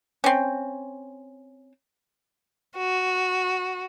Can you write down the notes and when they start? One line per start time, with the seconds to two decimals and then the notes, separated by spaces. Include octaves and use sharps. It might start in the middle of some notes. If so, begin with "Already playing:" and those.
0.24 C4 C#4
2.76 F#4